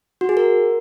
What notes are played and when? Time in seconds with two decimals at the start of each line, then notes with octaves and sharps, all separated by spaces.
0.21 F#4
0.29 G#4
0.37 A#4